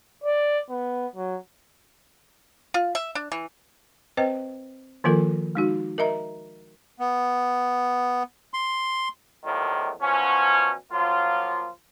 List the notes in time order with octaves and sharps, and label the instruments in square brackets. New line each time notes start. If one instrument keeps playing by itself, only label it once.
[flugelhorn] D5
B3
F#3
[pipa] F4
E5
D4
E3
[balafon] C4 B4 C5 D#5 G5
D#3 F3 A#3 F4 A4 A#4
G#3 D#4 F#4
A#4 D#5 E5 A#5
[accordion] B3
C6
[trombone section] E2 A2 D#3 F3 G3 A#3
B2 F3 F#3 C#4
F3 F#3 A#3 F4